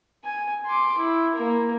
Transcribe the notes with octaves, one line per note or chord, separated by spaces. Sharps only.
G#5
C6 D6
E4
A#3 A#4